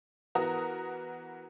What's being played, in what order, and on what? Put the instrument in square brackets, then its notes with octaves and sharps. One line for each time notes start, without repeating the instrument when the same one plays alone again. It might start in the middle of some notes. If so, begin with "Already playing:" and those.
[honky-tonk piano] E3 B3 F#4 A#4 A#5 D#6